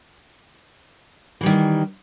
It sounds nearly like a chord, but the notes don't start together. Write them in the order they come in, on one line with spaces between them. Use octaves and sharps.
E3 G3 D#3